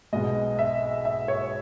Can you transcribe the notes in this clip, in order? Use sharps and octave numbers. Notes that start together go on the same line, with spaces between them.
B1 B2 G#3 D#5
E5
E5
C#5